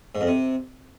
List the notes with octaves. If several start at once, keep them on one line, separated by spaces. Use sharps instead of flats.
G#2
F2
C3